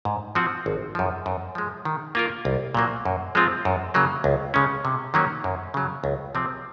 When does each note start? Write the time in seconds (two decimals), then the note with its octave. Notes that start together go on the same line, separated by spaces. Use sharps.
0.05 G#2
0.35 F3 C4 F#4
0.66 G#1
0.95 F#2 F3
1.26 F#2
1.55 F3 G#3
1.85 D#3
2.15 A#3 F4 A#4
2.45 C2
2.75 A#2 F#3 A#3
3.05 F#2
3.35 F3 G#3 C4 F4
3.65 F#2
3.94 C#3 F#3 A#3
4.24 C#2
4.54 C#3 G#3 C#4
4.85 C3
5.14 D#3 F#3 A#3 C#4
5.44 F#2
5.74 C#3 F#3
6.04 C#2
6.35 C3 F3 C4